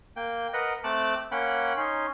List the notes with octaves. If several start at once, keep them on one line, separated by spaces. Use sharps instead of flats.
A#3 G5
A#4 B4 D#5 F#5
A3 C4 A5 D6 F#6
A#3 C#4 F#5 G5 B5
C#4 D#4 C6